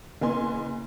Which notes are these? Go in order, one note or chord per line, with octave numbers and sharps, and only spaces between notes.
F#1 B3 G#5 C6